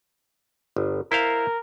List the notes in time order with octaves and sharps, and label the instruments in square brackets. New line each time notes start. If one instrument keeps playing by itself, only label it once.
[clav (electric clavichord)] G1
[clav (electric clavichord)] E4 C5 F5 [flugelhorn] A#4